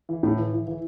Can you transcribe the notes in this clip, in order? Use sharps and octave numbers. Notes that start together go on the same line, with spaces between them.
E3
A2
E3
E3
E3